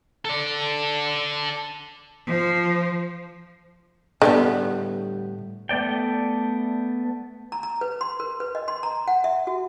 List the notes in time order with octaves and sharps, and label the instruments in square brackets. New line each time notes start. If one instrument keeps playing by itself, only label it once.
[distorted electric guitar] A4 D5
[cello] F3
[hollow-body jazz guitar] A2 G3 B3 [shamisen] D3
[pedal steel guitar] A3 B3 D5 G5
[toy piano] A#5
A#5
B4
C6
A#4
B4
D#5
C6
A#5
F#5
E5
F#4